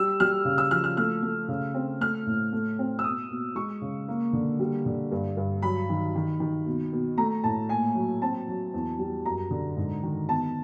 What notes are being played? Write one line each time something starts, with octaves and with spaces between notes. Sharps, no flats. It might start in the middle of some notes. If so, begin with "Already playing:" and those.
Already playing: G3 E6
G3 F6
C#3
E6
F3 F6
F6
A3 F6
A3
C#3
C4
A3 F6
A2
A3
C4
E6
B2 D#6
B2
G#3 C#6
C#3
A#3
D3
G3
D3
G2
G2
F#3 B5
D#3
D#3
D#3
B2
B2
A3 A#5
A2 A5
A#2 G#5
F#3
C4 A5
F#3
E2
G3
F#2 A#5
D3
G#2
D#3
B3 A5